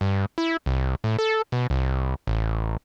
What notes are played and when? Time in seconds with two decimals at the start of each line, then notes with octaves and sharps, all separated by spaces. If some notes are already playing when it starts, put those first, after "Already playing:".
0.01 G2
0.38 E4
0.66 C2
1.04 A2
1.19 A4
1.52 B2
1.70 C2
2.27 A1